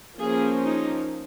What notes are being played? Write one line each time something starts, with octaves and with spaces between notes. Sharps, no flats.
F3 A#3 C#4 G#4
D#4